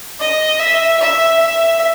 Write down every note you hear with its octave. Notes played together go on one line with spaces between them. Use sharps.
D#5
E5
E5
E5